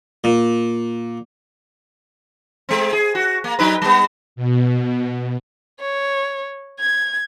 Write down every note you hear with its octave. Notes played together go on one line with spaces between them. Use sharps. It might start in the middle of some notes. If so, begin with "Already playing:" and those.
A#2
G#3 C4
G#4
F#4
A#3
F#3 D#4 B4
G3 B3
B2
C#5
G#6